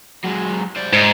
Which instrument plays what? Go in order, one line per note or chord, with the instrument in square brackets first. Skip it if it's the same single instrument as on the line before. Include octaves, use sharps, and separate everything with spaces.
[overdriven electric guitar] F#3 G#3
C5 D5
[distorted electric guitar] G#2